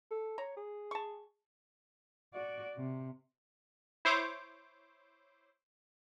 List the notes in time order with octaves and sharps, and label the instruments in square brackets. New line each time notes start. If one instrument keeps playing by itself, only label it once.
[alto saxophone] A4
[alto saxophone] C#5 [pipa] A#5
[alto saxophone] G#4
[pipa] A5 C#6
[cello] F#4 D5
C3
[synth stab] E4 C5 C#5 D6